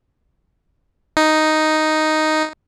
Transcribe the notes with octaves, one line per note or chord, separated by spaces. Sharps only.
D#4